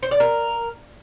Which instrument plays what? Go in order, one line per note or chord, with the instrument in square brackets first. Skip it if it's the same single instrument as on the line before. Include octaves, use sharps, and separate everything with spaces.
[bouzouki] C5
D5
A#4